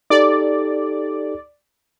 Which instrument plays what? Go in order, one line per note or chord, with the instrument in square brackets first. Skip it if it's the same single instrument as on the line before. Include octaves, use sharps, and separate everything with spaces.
[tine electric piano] D#4 G4 A4 [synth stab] D5